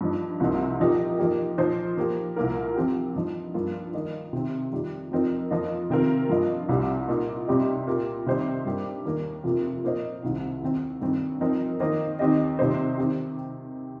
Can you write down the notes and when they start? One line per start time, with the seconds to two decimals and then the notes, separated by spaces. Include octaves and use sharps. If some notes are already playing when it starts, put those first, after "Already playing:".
0.01 G2 F3 D#4
0.40 C2 C3 F3 A#3 D#4
0.80 A#2 F3 D#4 G4 A#4
1.18 F3 A#3 D#4 G4
1.58 A#2 F3 D#4 C5
1.97 F3 A#3 G4
2.36 C2 A#2 A#3 F4 A#4
2.75 F3 C4 G4
3.15 G2 F3 D#4
3.54 G2 F3 A#3 F4
3.93 D#3 A#3 F4 D#5
4.33 C3 D#3 C4
4.72 F2 D#3 G3
5.12 F2 F3 C4 D#4 A#4
5.51 F2 F3 A#3 F4 D#5
5.90 C3 D#3 C4 F4 A#4
6.29 G2 F3 A#3 F4 D#5
6.69 C2 C3 G3
7.08 A#2 A#3 D#4
7.48 C3 G3 C4 G4 D#5
7.87 A#2 A#3 G4
8.26 C3 D#3 G3 D#4 C5
8.66 G2 G3 A#3 G4
9.05 D#2 D#3 A#3
9.44 F2 C3 F3 A#3 F4
9.84 A#2 A#3 F4 C5 D#5
10.23 C2 C3 D#3
10.63 D#2 D#3 C4
11.01 G2 D#3 C4
11.41 F3 C4 D#4 A#4
11.80 D#3 A#3 D#4 C5 D#5
12.19 D#2 D#3 C4 G4 D#5
12.59 C3 D#3 G3 D#4 C5
12.98 D#3 C4 G4